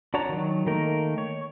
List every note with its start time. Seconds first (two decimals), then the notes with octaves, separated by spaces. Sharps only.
0.14 D4 F#4 C#5 A5 A#5
0.29 D#3 F#3
0.66 D#3 A3 A#3 D#4 A#4
1.18 C#5